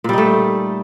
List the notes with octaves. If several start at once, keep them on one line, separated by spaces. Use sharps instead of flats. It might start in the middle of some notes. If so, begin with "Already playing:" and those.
A#2 G3 A3 D#4